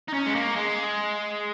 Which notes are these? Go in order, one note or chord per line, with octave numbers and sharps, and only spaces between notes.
D#4
C#4
G#3
A#3
G#3